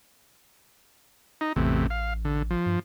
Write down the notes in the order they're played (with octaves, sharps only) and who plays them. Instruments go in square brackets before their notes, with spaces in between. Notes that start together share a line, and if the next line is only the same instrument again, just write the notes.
[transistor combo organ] D#4
[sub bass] A1 [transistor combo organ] E2 A2 C3
[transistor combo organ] F5
D3
F3
[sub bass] G2